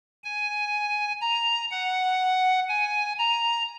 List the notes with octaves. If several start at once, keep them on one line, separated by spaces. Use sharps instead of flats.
G#5
A#5
F#5
G#5
A#5